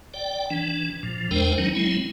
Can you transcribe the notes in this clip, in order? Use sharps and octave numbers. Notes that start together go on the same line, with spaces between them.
D5 G5
E3 D4
A#2 F3
E2 G#3 D4 A#4 C5 G5
D#3 F#3 C#4 D#4
F#3 G#3 C4 E4